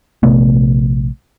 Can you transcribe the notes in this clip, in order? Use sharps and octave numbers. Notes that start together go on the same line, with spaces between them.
A#1 C3 A3 B3